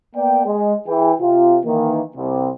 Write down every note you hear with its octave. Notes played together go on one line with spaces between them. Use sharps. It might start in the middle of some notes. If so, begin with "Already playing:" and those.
A#3 B3 D5 G5
G#3
E3 G#4 G5
C3 F4
D#3 E3 A#3
C2 C3